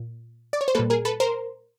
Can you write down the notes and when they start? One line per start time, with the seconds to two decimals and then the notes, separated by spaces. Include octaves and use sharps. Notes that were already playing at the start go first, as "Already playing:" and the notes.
Already playing: A#2
0.53 D5
0.61 C#5
0.68 C5
0.75 A#2 G3 A#3 A4 B4
0.90 G#4 A#4
1.05 A4 B4
1.20 A#4 C5